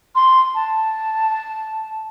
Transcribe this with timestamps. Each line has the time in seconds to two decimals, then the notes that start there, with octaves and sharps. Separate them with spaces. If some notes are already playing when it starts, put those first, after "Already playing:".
0.15 C6
0.55 A5